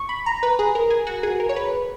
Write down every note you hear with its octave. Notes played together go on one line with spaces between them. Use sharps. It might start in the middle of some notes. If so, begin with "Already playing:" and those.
Already playing: C#6
B5
A#5
B4
G#4
A#4
G#4
F#4
G#4
A#4
C#5
B4